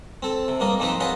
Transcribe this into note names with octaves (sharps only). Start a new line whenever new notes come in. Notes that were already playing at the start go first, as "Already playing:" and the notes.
C4 A4
C3
G2 G3 A#3 A#4 D#5
D#3 F3 C4 D#4 B4 C5
F4 F#4 G#4 B4 C#5 D#5